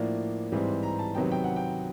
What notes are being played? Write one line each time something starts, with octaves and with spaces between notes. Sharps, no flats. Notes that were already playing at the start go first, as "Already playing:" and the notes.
Already playing: A2 F3 A#3 D4
G#2 E3 G3 C4
A#5
A5
C3 D#3 F#3 B3 D#4 G5
G5
F#5
G5